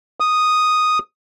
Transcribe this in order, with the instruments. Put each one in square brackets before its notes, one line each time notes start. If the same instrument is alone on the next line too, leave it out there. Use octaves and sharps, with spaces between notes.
[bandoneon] D#6